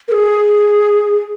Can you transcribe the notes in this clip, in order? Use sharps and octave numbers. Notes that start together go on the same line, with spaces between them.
A#4
G#4